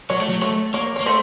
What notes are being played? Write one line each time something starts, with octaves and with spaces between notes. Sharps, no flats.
F#3 C#5
A3
F#3
A3 C#5
A#3 C#5
A#3 C#5
A3 C5